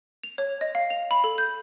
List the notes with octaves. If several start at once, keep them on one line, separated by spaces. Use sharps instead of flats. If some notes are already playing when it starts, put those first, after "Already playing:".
F7
C#5
D#5
F5
F7
B5
A4
G6